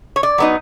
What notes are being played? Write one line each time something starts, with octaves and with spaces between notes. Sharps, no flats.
C#5
D5
F#3 B3 D#4